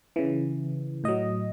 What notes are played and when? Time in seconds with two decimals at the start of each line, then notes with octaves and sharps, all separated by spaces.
0.16 C#3 E3
1.04 A2 F#3 D#5